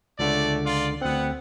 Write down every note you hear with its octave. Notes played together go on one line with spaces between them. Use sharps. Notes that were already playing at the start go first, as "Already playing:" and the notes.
C#2 D3 A3 D5
F4 D5
D2 B3 C4 F#5